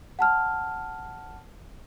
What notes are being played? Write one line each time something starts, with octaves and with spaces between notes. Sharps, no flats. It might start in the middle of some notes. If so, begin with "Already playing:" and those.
F#5 A5 F6